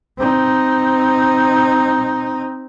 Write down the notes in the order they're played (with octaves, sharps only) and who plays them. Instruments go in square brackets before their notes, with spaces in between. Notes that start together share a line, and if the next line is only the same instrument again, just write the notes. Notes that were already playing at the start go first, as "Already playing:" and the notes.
[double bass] C4 D#4